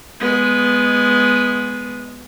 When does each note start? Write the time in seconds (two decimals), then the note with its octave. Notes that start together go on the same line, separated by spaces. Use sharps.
0.20 G#3 B3